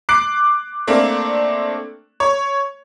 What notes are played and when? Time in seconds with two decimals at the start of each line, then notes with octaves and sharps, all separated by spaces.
0.09 D6 F#6 C7 D7
0.87 A3 A#3 C4 D4
2.20 C#5